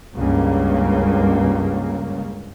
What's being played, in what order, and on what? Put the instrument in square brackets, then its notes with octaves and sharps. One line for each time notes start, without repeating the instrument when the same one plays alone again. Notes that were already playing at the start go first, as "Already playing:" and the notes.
[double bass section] C#2 G2 C#3 A#3